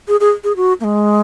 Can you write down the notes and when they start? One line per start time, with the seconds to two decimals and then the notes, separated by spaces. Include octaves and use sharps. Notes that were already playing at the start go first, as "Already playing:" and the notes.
0.08 G#4
0.20 G#4
0.44 G#4
0.56 F#4
0.80 A#3
0.84 G#3